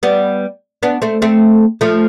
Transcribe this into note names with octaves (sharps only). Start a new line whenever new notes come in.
G3 B3
B3 D4
A3 C4
A3 C4
F3 A3